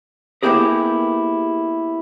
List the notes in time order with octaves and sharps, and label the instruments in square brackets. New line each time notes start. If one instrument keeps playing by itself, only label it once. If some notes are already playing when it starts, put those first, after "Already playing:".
[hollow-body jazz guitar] A#3 B3 E4 G4 G#4 A#4